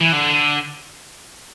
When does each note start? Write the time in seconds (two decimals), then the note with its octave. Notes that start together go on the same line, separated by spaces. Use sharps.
0.01 E3
0.13 D3